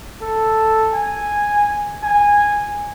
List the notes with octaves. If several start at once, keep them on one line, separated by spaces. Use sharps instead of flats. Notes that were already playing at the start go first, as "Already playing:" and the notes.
A4
G#5
G#5